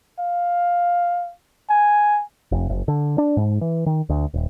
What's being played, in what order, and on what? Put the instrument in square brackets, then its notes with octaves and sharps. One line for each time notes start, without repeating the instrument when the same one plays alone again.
[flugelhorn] F5
G#5
[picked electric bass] F1
F#1
D3
D4
G#2
E3
D#3
D2
D#1